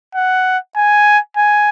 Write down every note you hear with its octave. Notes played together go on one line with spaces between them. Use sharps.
F#5
G#5
G#5